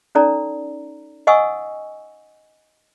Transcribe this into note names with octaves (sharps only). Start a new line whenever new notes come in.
C#4 D#4 A4 D5 A#5
D#5 F#5 G#5 C#6 D#6 E6